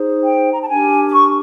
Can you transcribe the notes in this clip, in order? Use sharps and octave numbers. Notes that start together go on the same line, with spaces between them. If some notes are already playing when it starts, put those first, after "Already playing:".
Already playing: D#4 G#4 C5
G5
A#5
A5
D4 G4 A#4 G#5
D6
C#6